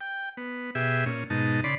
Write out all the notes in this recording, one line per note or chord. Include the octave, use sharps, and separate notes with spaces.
G5
B3
B2 G4 G#4 E5
A#2 C#4
G#2 B2 D#4 A5
C#3 D5 B5 C6